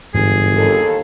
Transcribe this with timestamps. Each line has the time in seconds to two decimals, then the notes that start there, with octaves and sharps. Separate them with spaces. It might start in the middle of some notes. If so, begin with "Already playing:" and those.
0.15 G1 G#2 E3 G#4
0.56 D#2 A4